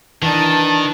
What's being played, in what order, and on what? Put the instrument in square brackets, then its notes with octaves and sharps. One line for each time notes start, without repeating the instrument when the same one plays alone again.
[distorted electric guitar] D#3 [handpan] E3 [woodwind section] D4 [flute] A5